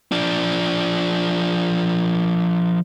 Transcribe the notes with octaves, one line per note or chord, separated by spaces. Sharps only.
F3 D4